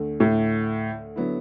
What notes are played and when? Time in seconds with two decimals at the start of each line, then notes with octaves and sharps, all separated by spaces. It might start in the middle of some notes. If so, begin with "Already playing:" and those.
Already playing: D2 D3 A3
0.20 A2
1.16 D3 F#3 B3 E4